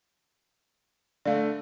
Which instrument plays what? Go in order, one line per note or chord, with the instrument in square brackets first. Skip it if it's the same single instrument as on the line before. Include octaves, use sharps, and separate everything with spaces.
[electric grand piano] D3 A3 [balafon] D5 F5